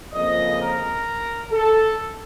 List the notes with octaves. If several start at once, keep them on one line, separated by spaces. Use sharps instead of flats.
F2 C#3 F3 A#3 D#5
A#4
A4